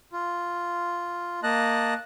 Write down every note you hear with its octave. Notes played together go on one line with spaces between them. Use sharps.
F4
A#3 D#5 A5 F#6